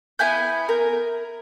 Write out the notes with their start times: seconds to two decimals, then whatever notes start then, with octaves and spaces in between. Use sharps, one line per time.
0.19 B3 E4 G#5 G6
0.69 A#4